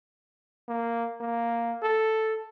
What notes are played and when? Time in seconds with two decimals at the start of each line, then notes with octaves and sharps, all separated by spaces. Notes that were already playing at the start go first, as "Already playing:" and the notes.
0.69 A#3
1.21 A#3
1.83 A4